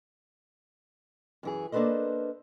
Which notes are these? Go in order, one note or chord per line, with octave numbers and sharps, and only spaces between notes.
F#2 E3 G#4
A#3 D4 A4 B4 C5 D#5